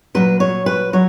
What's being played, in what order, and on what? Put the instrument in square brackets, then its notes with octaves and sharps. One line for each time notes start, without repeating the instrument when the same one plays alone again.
[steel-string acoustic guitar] A#2 F#3 B4
C#5
B4
F#3 C#5